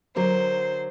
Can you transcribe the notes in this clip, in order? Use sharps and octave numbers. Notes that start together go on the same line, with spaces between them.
D3 F#3 A#4 C5